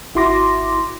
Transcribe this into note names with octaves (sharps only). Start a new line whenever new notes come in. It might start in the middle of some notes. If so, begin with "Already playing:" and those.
G#1 E4 F#4 C6 D6 A#6